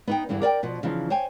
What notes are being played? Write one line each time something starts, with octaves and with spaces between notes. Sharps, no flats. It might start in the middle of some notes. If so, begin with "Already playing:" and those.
B3 D#4 G5
E2 G2 D3 E3
A#4 D5 D#5 G5
B2 F3
C#3 E3 F3 D#4
C5 C#5 G5 G#5